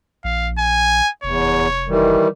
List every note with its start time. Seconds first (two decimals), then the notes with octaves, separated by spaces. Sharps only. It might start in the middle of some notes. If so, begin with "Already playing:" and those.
0.24 A#1 F5
0.59 G#5
1.24 F1 E2 C#5
1.88 D#3 E3 G3